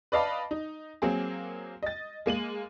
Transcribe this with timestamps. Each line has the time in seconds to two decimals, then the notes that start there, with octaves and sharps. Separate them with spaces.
0.12 B4 D5 D#5 F5 A5 B5
0.51 D#4
1.02 F#3 A#3 C4 G#4
1.83 D#5 A6
2.26 G#3 A#3 D#7 F#7